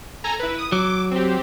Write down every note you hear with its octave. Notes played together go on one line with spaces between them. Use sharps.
A4 G#5 A#5
E4 B4
D#6
F#3 D6
C4 G4